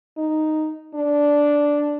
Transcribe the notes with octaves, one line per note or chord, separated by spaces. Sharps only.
D#4
D4